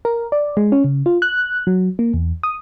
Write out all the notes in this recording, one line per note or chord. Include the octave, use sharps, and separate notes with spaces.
A#4
D5
G#3
C#4
C#3
F4
F#6
F#3
A#3
E2
D#6